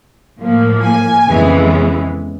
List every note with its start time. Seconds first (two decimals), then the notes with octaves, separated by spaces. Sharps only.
0.38 A2 F3 A#3
0.82 G#5
1.26 F2 C#3 E3 G#3 B3